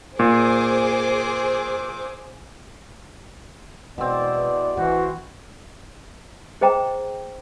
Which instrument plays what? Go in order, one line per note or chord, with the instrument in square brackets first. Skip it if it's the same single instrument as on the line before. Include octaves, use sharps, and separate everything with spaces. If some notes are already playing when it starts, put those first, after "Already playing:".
[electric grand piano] A#2 [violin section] G#4 C5 D6
[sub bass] E1 [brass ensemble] E2 D5 [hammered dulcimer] B2 C4
[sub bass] A1 [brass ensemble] E3 [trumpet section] F#4 [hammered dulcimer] C5
[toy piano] G#4 C5 D#5 G5 A#5